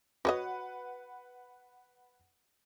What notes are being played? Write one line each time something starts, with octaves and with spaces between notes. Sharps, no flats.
F#4 B4 C#5 D#5 F#5